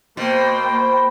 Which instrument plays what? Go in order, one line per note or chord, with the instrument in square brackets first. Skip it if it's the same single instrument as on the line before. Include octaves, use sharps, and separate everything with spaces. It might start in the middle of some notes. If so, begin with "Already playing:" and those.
[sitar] B2 [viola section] A#3 C5 G5